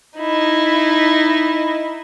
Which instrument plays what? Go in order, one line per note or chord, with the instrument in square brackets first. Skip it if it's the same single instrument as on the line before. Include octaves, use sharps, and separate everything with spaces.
[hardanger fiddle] D#4 E4